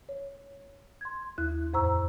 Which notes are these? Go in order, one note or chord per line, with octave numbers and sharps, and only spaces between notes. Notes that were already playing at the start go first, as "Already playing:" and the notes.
C#5
C6 G#6
D#2 E4 F#6
F2 A2 C5 A#5 C#6 E6